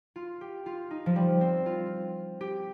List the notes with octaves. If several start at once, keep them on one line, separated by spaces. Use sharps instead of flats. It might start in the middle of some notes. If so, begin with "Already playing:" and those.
F4
G4
F4
D#4
F3
G3
C4
F4
G4